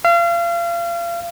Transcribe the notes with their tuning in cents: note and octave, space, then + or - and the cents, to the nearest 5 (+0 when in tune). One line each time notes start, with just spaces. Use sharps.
F5 -35